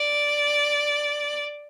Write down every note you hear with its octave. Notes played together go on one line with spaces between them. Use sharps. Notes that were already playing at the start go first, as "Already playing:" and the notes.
Already playing: D5